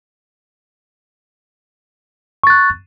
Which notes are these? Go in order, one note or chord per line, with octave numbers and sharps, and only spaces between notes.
C#6 F#6 A6